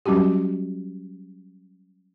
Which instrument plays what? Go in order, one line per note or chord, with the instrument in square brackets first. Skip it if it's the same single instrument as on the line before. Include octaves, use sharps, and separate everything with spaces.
[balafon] F#3 G3 C#4 F#4 G4